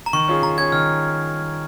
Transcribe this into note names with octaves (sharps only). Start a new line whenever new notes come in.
A#5
D#3 C#6
C#4 F4 G#4
D#3 A#5
C#4 F4 G#4 G#6
D#3 F6